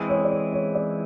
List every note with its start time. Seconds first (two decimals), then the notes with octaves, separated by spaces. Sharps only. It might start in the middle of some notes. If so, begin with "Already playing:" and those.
Already playing: E3 G#3 C4 E4 G#4
0.09 C#5
0.24 D5
0.31 C#5
0.53 C#5
0.75 D5